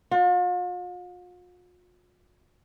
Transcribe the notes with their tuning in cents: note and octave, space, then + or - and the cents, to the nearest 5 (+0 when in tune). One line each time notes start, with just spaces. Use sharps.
F4 +45